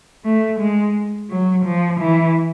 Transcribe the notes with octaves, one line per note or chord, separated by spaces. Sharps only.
A3
G#3
F#3
F3
E3